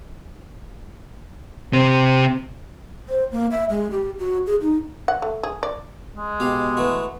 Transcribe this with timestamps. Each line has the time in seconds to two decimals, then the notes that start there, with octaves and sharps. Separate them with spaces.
1.73 C3 C4
3.09 C5
3.32 A#3
3.51 E5
3.70 G#3
3.91 G4
4.19 F#4
4.47 G#4
4.61 D#4
5.08 F#5
5.22 A3
5.43 G#4
5.63 D5
6.17 G#3
6.40 B2 G4 F5
6.77 E3 A3 F#4